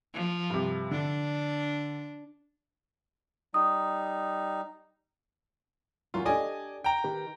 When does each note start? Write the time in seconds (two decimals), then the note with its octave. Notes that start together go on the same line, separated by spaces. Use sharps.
0.14 F3
0.50 G2 C3
0.91 D3 D4
3.54 G3 D#4 D#6
6.14 F#2 E3 F#3 F4
6.25 D4 G4 A4 D5 D#5 G#5
6.84 G5 A#5
7.04 D#3 G4 B4